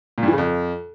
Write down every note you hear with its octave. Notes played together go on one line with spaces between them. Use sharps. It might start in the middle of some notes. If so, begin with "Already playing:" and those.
A#2
G2
E3
C#3
F2